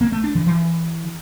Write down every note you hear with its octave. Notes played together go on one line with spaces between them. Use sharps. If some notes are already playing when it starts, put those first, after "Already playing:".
A#3
A3
D4
E3
E3